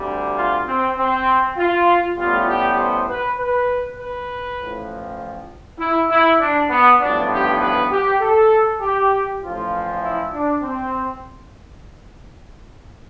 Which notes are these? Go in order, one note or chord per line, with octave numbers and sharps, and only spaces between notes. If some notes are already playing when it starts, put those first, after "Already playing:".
Already playing: D2 C3 G3
F4
C4
C4
F4
A1 A2 G3 B3 F4
G4
C5
B4
B4
B4
A1 A2 F3
E4
E4
D4
B3
A1 G2 F3 B3 D4
G4
B4
G4
A4
G4
A1 A2 F3 F4
E4
D4
C4